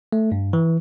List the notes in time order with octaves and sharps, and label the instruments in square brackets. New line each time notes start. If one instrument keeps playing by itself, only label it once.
[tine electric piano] A3
G2
E3